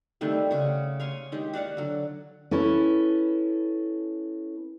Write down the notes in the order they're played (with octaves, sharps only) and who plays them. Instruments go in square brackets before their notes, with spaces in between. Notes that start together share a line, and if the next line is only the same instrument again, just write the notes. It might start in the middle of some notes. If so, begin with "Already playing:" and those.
[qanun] D#3 G3 A3 C4
C#3 F#4
C#5 F5 G#5 C6
D#3 G#3 G4
F#4 D5 F5 F#5
D3 F#3
[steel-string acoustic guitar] C#4 E4 A4 B4